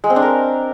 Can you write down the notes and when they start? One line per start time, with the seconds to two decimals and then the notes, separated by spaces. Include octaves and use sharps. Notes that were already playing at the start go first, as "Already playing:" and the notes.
0.04 G#3
0.10 C4
0.16 D4
0.22 A#4